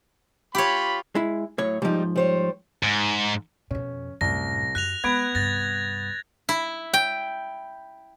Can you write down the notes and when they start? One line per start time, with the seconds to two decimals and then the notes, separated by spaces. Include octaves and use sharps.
0.55 F4 G4 C#5 B5
1.15 G#3 E4
1.58 A2 F#3 C#5
1.82 G#2 F3 G3 D#4
2.16 G3 C5 C#5
2.83 G#2
3.71 F2 B2 C#4
4.21 C2 F#2 A2 A#6
4.75 F#2 F#6 A#6 F7
5.04 G#3 B3 B5 G#6 D7
5.35 C2 G2 A6 A#6
6.49 E4
6.93 G5